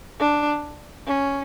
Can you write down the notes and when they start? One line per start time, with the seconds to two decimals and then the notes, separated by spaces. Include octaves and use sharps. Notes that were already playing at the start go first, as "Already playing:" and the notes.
0.19 D4
1.07 C#4